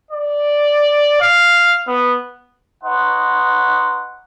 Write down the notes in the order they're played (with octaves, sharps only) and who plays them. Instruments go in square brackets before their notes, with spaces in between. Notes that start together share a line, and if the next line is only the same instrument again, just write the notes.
[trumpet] D5
F5
B3
[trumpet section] D#4 B4 C#5 D#5 F#5 C6